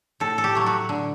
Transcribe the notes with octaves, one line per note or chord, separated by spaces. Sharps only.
A2 A4
A4
G4
F#3 A3
F#4
D3